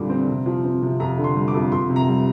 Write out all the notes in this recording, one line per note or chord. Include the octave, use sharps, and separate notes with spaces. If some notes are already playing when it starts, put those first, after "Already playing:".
Already playing: F2 A#2 D3 G3 D6
C4
C3
F3
C4
C3
F2 A#5
D3
C6
G3
D6
F2
F2 C6
C3
A#5
G3